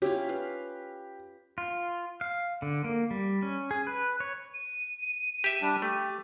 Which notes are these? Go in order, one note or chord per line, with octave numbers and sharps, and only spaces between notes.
C#4 E4 F4 G4
B4 F5
F4
F5
D3
A#3
G3
C#4
G#4
B4
C#5
D#7
G4 E5
G3 D4
A3 G4